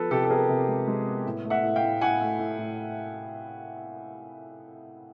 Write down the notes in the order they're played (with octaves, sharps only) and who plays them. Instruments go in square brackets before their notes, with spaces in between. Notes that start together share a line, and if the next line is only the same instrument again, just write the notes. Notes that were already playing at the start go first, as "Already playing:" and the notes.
Already playing: [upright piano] F3 B3 A4 B4
C3 G4 A4
A4
B3 G#4 A#4
C3
G#3
G#3
B3
A2
A3
E5 F#5
A2
F5 G5
A2
A2 F#5 G#5
A3
A2
A2